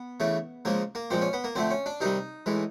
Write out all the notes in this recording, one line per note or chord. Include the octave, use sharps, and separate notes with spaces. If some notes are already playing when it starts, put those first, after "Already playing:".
Already playing: B3
C#3 E3 A3
C#3 F3 G#3 A#3
A#3
A#2 F3 G#3 C4
C#4
B3
A#3
D3 F3 A3 C4
C#4
D4
C3 D#3 G3 D#4
A2 E3 G#3